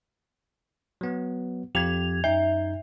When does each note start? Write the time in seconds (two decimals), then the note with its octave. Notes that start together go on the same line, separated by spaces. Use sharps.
1.01 F#3 B3
1.75 F2 G4 G#6 F7
2.24 F#2 D#4 E5 G6